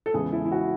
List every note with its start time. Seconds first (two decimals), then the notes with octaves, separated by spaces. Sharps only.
0.06 A4
0.13 E2 C#3 E3 G#3 G#4
0.33 E4
0.45 E4
0.52 F#4